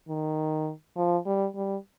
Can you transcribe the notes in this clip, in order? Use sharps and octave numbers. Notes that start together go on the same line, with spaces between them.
D#3
F3
G3
G3